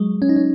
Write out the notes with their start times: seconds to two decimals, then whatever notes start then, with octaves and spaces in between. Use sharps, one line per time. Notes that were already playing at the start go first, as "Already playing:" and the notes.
Already playing: F#3 G#3
0.22 C#4
0.29 D#4
0.36 C#4